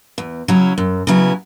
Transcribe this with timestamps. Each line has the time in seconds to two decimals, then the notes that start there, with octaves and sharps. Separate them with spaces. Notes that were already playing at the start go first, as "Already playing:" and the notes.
0.18 E2
0.48 C#3 F#3 C#4 E4
0.78 F#2
1.07 C#3 F#3 B3 E4